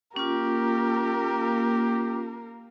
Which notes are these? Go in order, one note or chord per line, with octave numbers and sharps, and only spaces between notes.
A#3 C#4 F4 G4 A#4